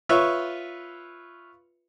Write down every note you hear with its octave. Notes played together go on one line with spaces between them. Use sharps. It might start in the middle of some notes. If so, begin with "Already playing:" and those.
F4 B4 C#5 E5